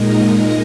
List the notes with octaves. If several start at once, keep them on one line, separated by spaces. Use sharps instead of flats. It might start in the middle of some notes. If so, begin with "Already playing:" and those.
Already playing: A#2 G#3 D#4 A#4 D#5